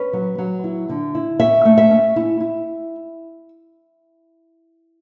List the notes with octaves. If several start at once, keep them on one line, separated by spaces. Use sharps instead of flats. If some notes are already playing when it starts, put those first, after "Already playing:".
Already playing: C#4 B4
F#3
F#3
E4
D3
E4
C#4 E5
A3
E5
C#4
E4
E4